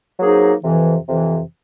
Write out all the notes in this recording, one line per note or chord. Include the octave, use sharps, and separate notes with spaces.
F#3 A#3 D#4 G#4 C5
F2 C3 E3
F2 C3 E3